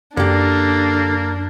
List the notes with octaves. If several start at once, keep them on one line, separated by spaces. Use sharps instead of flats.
F#2 D3 A#3 D4 G4 A6 A#6